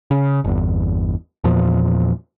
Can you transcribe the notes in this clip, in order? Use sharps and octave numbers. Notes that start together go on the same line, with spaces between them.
C#3
G1 E2
E2 A#2 F3